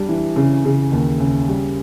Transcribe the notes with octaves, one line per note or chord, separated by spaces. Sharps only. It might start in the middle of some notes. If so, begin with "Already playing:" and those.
Already playing: G3 D4
E3
C#3
C#3
D#2
C#3
G3